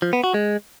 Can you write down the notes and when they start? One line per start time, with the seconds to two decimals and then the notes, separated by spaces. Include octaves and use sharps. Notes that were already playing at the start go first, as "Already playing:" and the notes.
0.02 F3
0.13 B3
0.24 F#4
0.34 G#3